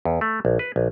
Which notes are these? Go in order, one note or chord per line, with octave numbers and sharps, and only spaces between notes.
E2
A3
A#1
B4
A#1